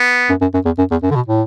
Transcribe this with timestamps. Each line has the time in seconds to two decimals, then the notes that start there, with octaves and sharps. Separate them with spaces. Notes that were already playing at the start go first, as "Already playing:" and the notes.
Already playing: B3
0.29 F#2
0.41 F#2
0.54 F#2
0.65 E2
0.78 F#2
0.91 E2
1.03 F#2
1.11 D3
1.15 B2
1.28 A2